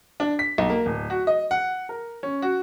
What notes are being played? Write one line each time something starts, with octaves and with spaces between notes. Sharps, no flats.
D4
B6
B1
A#3
D1
F#4
D#5
F#5
A#4
C#4
F#4